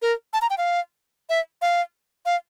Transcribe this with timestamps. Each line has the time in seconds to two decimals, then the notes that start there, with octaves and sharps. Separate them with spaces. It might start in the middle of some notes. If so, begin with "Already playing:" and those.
0.02 A#4
0.33 A5
0.42 A#5
0.50 G5
0.58 F5
1.29 E5
1.62 F5
2.26 F5